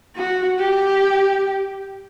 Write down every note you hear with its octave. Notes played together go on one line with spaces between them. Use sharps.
F#4
G4